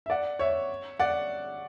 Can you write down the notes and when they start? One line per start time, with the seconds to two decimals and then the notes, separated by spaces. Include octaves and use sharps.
0.06 E5
0.10 D5 F#5
0.39 C#5 E5
1.00 D5 F#5